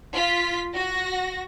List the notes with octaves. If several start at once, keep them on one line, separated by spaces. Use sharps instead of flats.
F4 B6
F#4 A#6